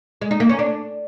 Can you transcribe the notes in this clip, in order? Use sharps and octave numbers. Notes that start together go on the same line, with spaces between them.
G#3
D#4
A#3
C#4
D4